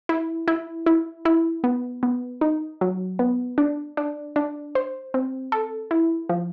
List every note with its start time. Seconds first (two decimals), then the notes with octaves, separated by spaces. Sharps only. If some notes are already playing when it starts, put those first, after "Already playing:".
0.09 E4
0.48 E4
0.86 E4
1.25 E4
1.64 B3
2.03 B3
2.41 D#4
2.81 F#3
3.19 B3
3.58 D4
3.97 D4
4.36 D4
4.75 C5
5.14 C4
5.52 A4
5.91 E4
6.29 F3